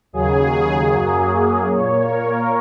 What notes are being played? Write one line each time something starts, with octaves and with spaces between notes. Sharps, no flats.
D#2 C#3 F#3 G#4
F#2 F#3 A#3
A#2 A#3 C#5
A#4